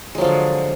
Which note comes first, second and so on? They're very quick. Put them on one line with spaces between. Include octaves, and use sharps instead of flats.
G#3 F#3 F3 D3